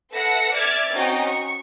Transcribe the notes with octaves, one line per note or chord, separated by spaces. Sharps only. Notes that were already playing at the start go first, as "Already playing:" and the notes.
A4 B4 E5 F#5 A#6 C#7
D5 E5 F6 G#6 A6
C4 C#4 D#4 F#4 G5
C#6